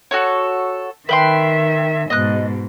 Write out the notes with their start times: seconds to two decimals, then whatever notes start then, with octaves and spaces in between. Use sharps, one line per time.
0.11 F#4 A4 C#5
1.09 D#3 B4 E5 G5 C6
2.10 G#2 B2 D#5 F#6